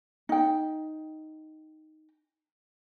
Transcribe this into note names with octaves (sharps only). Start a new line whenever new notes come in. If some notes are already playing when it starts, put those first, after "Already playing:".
D#4 G5